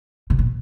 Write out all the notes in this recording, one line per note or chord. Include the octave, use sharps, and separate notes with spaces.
C3
A#2